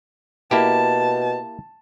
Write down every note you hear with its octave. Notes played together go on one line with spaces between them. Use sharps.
B2 A#3 E4 G4 A5